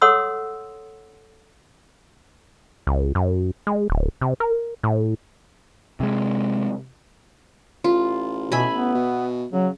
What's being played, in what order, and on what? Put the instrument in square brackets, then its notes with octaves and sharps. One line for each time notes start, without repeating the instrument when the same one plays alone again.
[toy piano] A4 C#5 F#5 C6 D#6 E6
[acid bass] C#2
F#2
G#3
D1
C3
A#4
A2
[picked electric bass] C3 G#3
[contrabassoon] A1 [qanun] F4
[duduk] B2 [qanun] E5 G#5 B5
[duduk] B3
[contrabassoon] B2
[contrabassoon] C#3 [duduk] F#3